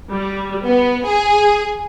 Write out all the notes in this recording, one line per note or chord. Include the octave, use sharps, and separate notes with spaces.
G3
B3
G#4